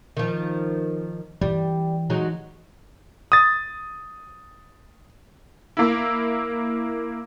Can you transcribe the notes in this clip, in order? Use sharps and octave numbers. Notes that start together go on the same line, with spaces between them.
D#3 F3
E3 G3
F#3 G#3 D#4
D#6 A6
A#3 E4